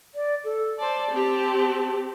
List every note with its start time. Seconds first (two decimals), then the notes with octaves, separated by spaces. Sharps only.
0.15 D5
0.44 A4
0.79 C5 D5 A5
1.11 C4 G4